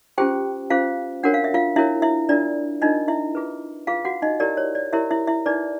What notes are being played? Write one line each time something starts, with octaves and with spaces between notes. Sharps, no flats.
C#4 F4 G4 G#4 C5 G5
C#4 F4 G#4 C5 F5
D4 F#4 A#4 C#5 F#5
F5
E5
F4 F5
D4 E4 F#4 A#4 C#5 E5
E4 E5
D4 F4 A#4 D5
D4 D#4 F4 A#4 D#5
E4 E5
F4 G#4 B4
F4 G#4 B4 F5
F#4 F#5
D#4 D#5
E4 G4 A#4 C#5 D5
C#5
D5
E4 G4 A#4 C#5 E5
E4 E5
E4 E5
D#4 G#4 B4 D5